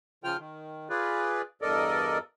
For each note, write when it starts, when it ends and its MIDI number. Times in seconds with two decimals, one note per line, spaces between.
0.24 0.37 49
0.24 0.37 53
0.24 0.37 65
0.24 0.37 79
0.24 0.37 89
0.39 0.88 51
0.90 1.42 65
0.90 1.42 68
0.90 1.42 71
0.90 1.42 74
1.62 2.18 40
1.62 2.18 43
1.62 2.18 69
1.62 2.18 70
1.62 2.18 74
1.62 2.18 75